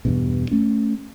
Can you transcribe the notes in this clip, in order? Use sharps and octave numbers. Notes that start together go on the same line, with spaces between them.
E2 G2 B2
A3 C#4